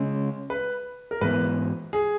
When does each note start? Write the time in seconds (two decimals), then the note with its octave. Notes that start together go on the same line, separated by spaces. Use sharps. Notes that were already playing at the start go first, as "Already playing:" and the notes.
Already playing: C#3 G#3 C#4
0.50 B4
1.11 A#4
1.21 G#2 E3 B3 B4
1.93 G#4